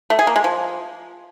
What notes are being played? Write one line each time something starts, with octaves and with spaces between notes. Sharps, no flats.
A3
G#4
A#3
G#3
F3